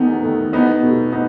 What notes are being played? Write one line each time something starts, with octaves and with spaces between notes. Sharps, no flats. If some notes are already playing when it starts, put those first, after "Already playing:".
Already playing: E2 D#3 A3 B3 D#4
D#3 A3
E2 B3 D#4
B2 A3
B3 D#4